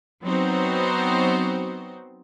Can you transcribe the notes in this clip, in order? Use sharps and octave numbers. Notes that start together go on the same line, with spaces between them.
F#3 B3 C4 D#4 F#4 C5